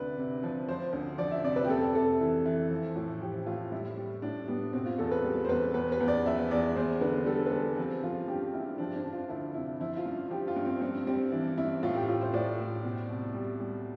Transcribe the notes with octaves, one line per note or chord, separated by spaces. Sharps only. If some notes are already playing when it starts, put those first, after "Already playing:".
Already playing: D2 C3 B4 D5
C3
F3
F3 C5
D2
F3 D5
E5
C3 D5
B4
G4
F2 A4
C3 A4
E3
E3
F3
A2
F3 G4
A2 F4
G3 E4
G3
A2 D4
G3 B3
B2 C4
F4
E2 A4
B4
G3
C5
E2 B4
E2 B4
B4
E2
D5
F3 E5
E2 D5
E2 C5
D3 B4
G3 A4
B4
G3 A4
F3 C4
F3 F4
G2 G4
G2 E4
F3 D4
D4
F3
F4
D2 E4
C3 E4
F3 E4
F4
G2
F3 G4
F4
G2
C4
G2 C4
G3 C4
E3 D4
G2 E4
A2 F4
G4
A2 F4
C5
A2 D5
A2
B2
C2
G3
G3